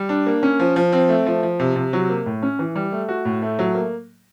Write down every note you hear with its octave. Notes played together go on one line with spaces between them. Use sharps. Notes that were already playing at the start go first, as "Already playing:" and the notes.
Already playing: G3
D4
A#3
C#4
F3
F3
C4
A3
F3
F3
C3
C3
F#3
A#3
A2
C#4
E3
G3
A3
F#4
A2
A3
F#3
A#3